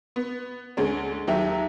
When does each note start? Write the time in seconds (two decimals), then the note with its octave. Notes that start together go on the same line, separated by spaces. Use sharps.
0.16 B3
0.77 D2 G#3 C#4
1.27 D#2 F#3 G4 E5